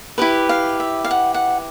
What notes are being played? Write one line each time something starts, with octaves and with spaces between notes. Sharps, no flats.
E4 G4 B4
F5
E5
F5
F#5
F#5